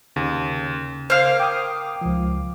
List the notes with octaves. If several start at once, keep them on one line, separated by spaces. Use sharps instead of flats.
D#2 C#3
A#3 C5 F5
G5 D6 D#6
C#2 F3